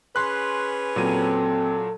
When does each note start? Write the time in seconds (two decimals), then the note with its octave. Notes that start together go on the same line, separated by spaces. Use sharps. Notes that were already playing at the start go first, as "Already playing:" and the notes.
0.16 C#4 G#4 B4 C6 F#6
0.96 A#2 F#3 C4 A4 D#7